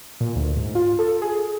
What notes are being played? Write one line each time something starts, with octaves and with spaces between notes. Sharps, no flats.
A#2
D2
G#2
F4
A4
G#4